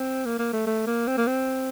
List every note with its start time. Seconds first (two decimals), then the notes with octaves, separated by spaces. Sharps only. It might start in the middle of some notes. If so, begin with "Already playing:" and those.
Already playing: C4
0.26 A#3
0.39 A#3
0.53 A3
0.66 A3
0.87 A#3
1.07 C4
1.17 A#3
1.27 C4